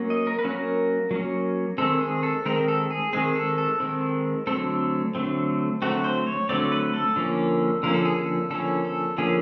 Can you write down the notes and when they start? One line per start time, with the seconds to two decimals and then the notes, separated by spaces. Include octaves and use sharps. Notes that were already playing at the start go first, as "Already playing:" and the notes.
Already playing: F#3 A#3 C#4
0.10 D#5
0.27 A#4
0.39 B4
0.44 F#3 A#3 C#4
0.51 A#4
1.11 F#3 A#3 C#4
1.78 D#3 G#3 C4 A4
2.01 G#4
2.23 A4
2.46 D#3 G#3 C4 A#4
2.68 A4
2.90 G#4
3.13 D#3 G#3 C4 G#4
3.35 A4
3.58 A4
3.80 D#3 G#3 C4
4.47 D3 F#3 A3 C4 A4
5.15 D3 F#3 A3 C4
5.82 D3 F#3 A3 C4 F#4
6.04 C5
6.27 C#5
6.49 D3 F#3 A3 C4 D5
6.72 B4
6.93 A4
7.16 D3 F3 A#3 C#4
7.83 D3 F3 A#3 C#4 A#4
7.94 A4
8.05 G#4
8.16 A4
8.50 D3 F3 A#3 C#4 A4
8.84 A4
9.18 D3 F3 A#3 C#4 G#4